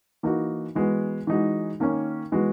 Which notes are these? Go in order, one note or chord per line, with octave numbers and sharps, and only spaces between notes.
E3 A#3 D#4 F#4
E3 G#3 B3 F#4
E3 G#3 D#4 F#4
D#3 A#3 C#4
E3 G#3 B3 F#4